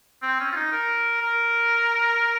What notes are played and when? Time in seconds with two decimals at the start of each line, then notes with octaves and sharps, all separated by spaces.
0.22 C4
0.40 C#4
0.52 F4
0.56 D#4
0.72 A#4
1.21 A#4